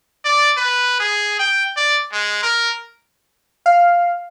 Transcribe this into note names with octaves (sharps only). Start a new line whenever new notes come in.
D5
B4
G#4
G5
D5
G#3
A#4
F5